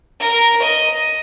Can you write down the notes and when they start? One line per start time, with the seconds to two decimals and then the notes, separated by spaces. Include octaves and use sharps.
0.20 A#4
0.63 D#5